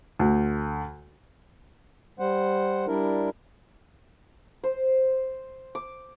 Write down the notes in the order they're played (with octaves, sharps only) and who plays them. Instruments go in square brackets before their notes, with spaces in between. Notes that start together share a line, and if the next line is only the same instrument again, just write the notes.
[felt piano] D2
[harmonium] G3 C5 F#5
G3 D4 E4 A#4
[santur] C5
D6